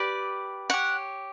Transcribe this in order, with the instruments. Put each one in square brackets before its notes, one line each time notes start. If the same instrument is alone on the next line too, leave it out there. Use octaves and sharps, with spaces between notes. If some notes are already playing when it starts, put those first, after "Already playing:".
Already playing: [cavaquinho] G4 B4 D5
G4 C#5 F#5